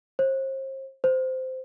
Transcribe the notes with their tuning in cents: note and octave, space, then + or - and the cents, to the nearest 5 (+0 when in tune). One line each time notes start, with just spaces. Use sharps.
C5 +35
C5 -15